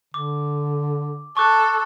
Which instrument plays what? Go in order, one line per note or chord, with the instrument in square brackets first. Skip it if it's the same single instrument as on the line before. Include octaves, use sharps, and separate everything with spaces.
[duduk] D3 [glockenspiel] D6
[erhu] A4 [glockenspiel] C#6 D6 F#6